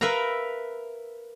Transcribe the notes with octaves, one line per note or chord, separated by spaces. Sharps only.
A#4 B4 E5 F5 A#5